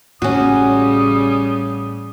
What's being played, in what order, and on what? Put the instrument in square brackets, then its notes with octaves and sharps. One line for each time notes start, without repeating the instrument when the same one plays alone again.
[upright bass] A1 A2 [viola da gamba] C#3 G3 [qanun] C#4 F#4 [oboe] D#6